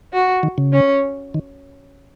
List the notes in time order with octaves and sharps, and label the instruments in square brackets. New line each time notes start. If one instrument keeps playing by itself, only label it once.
[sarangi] F#4
[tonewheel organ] D#3
C#3
[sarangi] C#4
[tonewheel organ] D#3